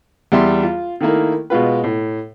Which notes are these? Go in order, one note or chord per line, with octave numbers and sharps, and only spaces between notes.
E2 G3 E5 C6
F4
D#3 A3 A#3 E4
B2 G#3 F4 B4
A2